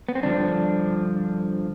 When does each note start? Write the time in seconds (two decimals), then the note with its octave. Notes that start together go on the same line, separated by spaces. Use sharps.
0.08 B3
0.15 C4
0.23 G2 D3 F3 D4